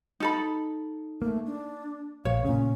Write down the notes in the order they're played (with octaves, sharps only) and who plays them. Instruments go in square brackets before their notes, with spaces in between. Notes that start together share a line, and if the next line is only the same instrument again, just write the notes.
[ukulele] D#4 A4 B5
[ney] A3 [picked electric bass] A#3
[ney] D4
[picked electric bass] A#1 [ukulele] C#5 [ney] F5
[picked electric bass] A#2 C#3 [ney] C#4